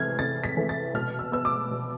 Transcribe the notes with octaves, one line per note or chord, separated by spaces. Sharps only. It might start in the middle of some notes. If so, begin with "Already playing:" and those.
Already playing: C3 E3 A3 F6 G#6
C3 A6
B6
E3 A3
A6
B2 F6
E6
B3 E6
D6
B2